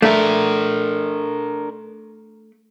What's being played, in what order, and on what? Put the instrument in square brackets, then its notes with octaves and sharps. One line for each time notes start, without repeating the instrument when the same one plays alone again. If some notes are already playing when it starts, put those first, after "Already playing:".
[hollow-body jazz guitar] A3 [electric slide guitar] D4 A#4